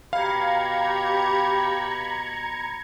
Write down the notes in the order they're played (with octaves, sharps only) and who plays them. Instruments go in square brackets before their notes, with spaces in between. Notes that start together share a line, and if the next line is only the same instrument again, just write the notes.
[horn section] B2 B5 [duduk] G4 [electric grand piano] F5 [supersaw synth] A#5 G#6 C#7